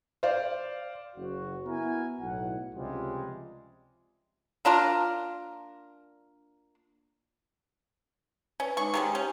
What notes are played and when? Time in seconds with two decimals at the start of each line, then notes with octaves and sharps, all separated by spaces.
0.23 C5 D5 F5
1.16 F#1 C#3 F#4
1.66 B3 E4 F#4 A#4 G#5
2.21 B1 A2 F#5
2.75 C#2 C3 F3 G3 G#3
4.65 A#3 D4 F4 A#4
8.60 C#4 B4 D5
8.77 G#3 D#4 C#6 D6
8.94 D#3 G#3 C#4 G4 A#5
9.15 C#4 G4